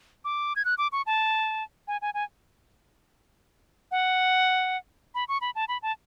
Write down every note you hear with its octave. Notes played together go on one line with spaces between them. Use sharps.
D6
G#6
F#6
D6
C#6
A5
G#5
G#5
G#5
F#5
B5
C#6
B5
A5
B5
A5